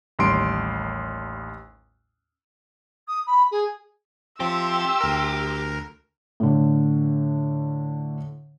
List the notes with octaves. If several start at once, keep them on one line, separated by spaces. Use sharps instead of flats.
A1 D#2 G3 C6 D7
D#6
B5
G#4
F3 C4 G4 E5 A5 C6 E6
D2 A#4
A2 D3